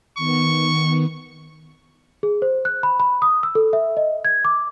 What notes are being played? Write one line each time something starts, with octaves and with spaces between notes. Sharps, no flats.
D#3 B3 C#6
G#4
C5
F#6
B5
B5
D#6
E6
A4
E5
D#5
G#6
D6